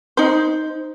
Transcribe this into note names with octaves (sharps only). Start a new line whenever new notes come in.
D#4 C5